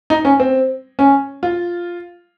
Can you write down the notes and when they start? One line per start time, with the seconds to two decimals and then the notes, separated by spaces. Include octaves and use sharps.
0.10 D#4
0.25 C#4
0.40 C4
0.99 C#4
1.43 F4